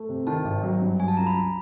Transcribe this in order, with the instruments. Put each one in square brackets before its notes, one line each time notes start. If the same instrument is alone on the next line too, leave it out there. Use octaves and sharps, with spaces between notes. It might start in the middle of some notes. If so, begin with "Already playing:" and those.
Already playing: [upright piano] A3
C3
[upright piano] D#3 [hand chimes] A5
[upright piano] G#1
F#3
G2
[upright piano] F#3 [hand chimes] G#5
[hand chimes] A5
[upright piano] C#2 [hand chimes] A#5
[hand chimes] B5
[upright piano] C#2